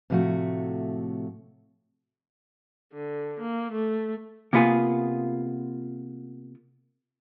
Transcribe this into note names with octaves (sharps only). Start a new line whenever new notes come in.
A2 C3 F3 G#3 A3 F#4
D3
A#3
A3
C3 A#3 B3 F4 G#4